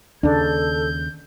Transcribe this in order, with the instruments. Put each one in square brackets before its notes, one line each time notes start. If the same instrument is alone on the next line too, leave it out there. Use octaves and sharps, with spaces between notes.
[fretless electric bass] D#2 C#3 [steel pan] D4 [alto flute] A4 [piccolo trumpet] G6